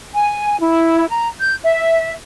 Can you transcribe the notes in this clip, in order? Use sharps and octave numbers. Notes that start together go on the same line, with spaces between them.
G#5
E4
A#5
G6
E5